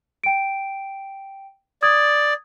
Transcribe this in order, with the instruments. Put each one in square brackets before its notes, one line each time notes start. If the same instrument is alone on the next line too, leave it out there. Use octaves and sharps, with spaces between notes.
[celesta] G5 D7
[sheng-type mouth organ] D5 [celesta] D#6 G#6